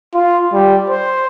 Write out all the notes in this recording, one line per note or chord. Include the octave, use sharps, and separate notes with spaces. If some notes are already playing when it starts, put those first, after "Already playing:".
F4
G3
C5